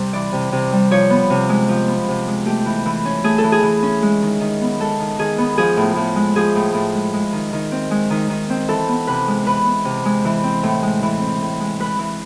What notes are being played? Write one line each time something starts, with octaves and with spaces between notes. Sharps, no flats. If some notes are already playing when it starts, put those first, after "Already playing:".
Already playing: C3 G3 C5
E3 D5
C3
C3
G3
F3 C#5
B3
C3
G#3
F3
B3
C3
G#3
A3 G4
E3
E3
C#4
A3 G#4
A4
E3
G#4
E3
C#4
G#3
D#3
D#3
B3
G#3 A4
D#3
D#3 G#4
B3
F3 G#4
A2
A2
G#3
F3 G#4
A2
A2
G#3
G#3
D#3
D#3
C4
G#3
D#3
D#3
C4
E3 A4
B3
C3 B4
G#3
E3 B4
B3
C3
G#3
E3
C4
A2
G#3
E3
C4
A2
G#3
G#3 B4
E3